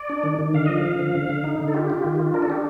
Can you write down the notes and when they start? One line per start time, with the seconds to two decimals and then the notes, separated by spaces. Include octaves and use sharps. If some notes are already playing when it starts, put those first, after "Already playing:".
Already playing: D5
0.09 D4
0.23 D#3
0.39 D#3
0.54 D3 F5
0.66 F3 D#5
0.77 F5
0.84 F3
0.99 D3
1.14 D3
1.29 D3
1.44 D#4
1.59 D3
1.68 A4
1.74 F4 G4
1.90 F4
2.04 D#3
2.19 F4
2.34 D4 A#4
2.42 A4
2.50 D4 G4